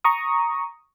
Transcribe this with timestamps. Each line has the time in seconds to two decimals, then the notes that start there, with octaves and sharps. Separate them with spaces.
0.04 A#5 C#6 D#6